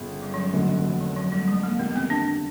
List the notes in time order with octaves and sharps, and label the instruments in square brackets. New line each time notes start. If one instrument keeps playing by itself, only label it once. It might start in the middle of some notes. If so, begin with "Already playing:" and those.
Already playing: [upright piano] G1 C#3
[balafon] G3
F#3
G3
[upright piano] F1 D#2 D3 F#3 A3
[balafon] F3
F#3
F#3
G3
G#3
A#3
[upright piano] F1 D#2 D#3 G3 A#3 [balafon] B3
[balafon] B3
C4
D4